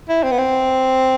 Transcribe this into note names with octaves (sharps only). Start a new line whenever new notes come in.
E4
C4
B3
C4